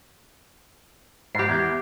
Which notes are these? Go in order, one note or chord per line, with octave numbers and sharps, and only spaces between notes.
G#2 G4 C7
E2